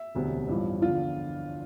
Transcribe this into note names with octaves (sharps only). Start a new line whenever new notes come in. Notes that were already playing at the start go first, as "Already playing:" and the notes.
Already playing: E5
E1 D2 C3
A1 G2 F3
E2 D3 F3 F4